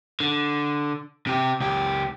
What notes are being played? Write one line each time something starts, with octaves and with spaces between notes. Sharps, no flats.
D3
C3 G4
C#2 G4